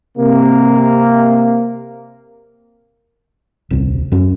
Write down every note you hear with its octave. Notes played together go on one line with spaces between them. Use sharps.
C3 A#3
D#1 C2
F#2 C#4